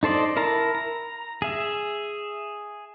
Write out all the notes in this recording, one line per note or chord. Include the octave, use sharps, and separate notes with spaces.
D#4 A4 C5 D5 D#5
E4 A#4 A5 A#5
A#5
G#4 E5